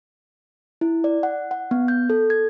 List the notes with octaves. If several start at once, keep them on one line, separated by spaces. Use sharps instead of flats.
E4
D5
F#5
F#5
B3
G6
A4
G#6